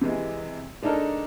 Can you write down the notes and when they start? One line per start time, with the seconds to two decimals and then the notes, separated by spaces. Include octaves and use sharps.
0.01 C3 E3 G#3
0.82 G#3 D4 D#4 A4 A#4